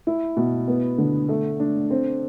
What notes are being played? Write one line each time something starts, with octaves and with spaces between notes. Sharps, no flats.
E4
B2
B3
D3
A3
D4
C4